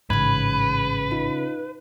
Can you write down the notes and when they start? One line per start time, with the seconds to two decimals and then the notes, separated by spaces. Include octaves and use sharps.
0.10 A1 G#2 C#3 B4 B5 G#6
1.11 D#4 F4